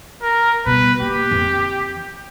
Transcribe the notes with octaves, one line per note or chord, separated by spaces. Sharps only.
A#4
B2 G3 B4
A#3 G4
F2 E3